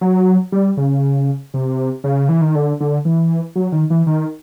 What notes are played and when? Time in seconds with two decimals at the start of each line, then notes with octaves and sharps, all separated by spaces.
0.01 F#3
0.52 G3
0.77 C#3
1.54 C3
2.04 C#3
2.29 E3
2.41 D#3
2.55 D3
2.80 D3
3.05 E3
3.56 F#3
3.72 D#3
3.90 E3
4.07 D#3